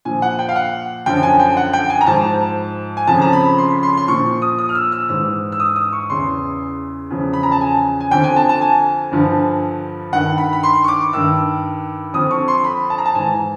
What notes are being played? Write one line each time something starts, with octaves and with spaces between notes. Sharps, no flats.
A#2 F3 G#5
F#5
G5
F5
F#5
F#2 D3 F3 G5
G#5
G5
F#5
G5
G#5
A#5
G#2 F3 A5
G#5
F2 C#3 F3 A5
A#5
B5
C6
B5
C6
C6
A#2 F3 C#6
D#6
D#6
F6
E6
E6
G#2 E3 E6
E6
D#6
D#6
C#6
E2 C#3 E3 C6
E2 C#3 F3
B5
A#5
A5
G#5
G#5
F2 D3 F3 G5
G#5
A5
A5
G#5
G2 D3 F3
G2 D#3 F#5
B5
B5
C6
C#6
D6
G2 D#3 E6
F2 D3 F3 D#6
C#6
C6
B5
A5
A#5
A5
G#2 E3 G#5